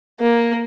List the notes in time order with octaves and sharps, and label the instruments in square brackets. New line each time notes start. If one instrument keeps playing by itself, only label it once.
[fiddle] A#3